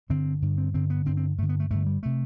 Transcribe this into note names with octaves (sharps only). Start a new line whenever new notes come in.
G2 D3 C4
G2 D3
C4
G2 D3 C4
B3
G2 D3 C4
C4
G2 D3 A3
B3
A3
G2 D3 A3
G3
C3 A3